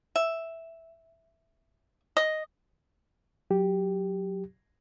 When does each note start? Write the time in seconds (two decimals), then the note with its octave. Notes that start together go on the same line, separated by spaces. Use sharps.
0.16 E5
2.17 D#5
3.51 F#3 G4